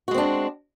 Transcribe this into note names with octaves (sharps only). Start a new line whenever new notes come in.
G#3 C4 D4 F#4